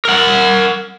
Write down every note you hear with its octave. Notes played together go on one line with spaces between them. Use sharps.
A#4 F#5